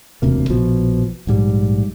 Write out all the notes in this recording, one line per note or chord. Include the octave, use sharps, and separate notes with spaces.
E1 D2 C3 A#3
A#1 B2 F3
A#1 G#2 G3